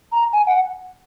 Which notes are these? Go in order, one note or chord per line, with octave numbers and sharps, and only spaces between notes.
A#5
G#5
F#5